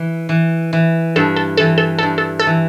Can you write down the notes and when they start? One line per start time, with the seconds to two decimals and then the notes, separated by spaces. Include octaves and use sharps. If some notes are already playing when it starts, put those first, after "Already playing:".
Already playing: E3
0.29 E3
0.73 E3
1.16 G2 A4
1.36 A4
1.57 E3 A4
1.78 A4
1.99 G2 A4
2.18 A4
2.39 A4
2.47 E3